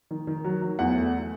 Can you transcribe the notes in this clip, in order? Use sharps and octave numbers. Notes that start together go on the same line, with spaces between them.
D#3
D#3
F#3
F#3
E2 F#5
A3